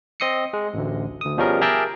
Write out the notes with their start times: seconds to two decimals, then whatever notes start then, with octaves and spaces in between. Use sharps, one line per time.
0.20 C4 D#5 D#6 C7 C#7
0.53 G#3
0.74 A1 D2
1.21 D2 D#6
1.37 B2 F3 G3 C#4 G#4 A#4
1.61 G4 G#4 A#4 E5 G5 A5